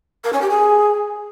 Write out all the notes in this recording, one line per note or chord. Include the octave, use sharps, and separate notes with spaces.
A#4
C#4
G4
G#4